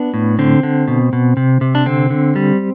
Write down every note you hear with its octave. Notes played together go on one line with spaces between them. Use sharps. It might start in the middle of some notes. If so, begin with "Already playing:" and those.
Already playing: B3 D4
A2
D3 C4
D3
B2
B2
C3
C3
D4
D3 C4
D3
G3